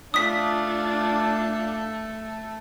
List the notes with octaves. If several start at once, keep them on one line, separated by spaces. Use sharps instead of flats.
A3 D4 F4 D#6 B6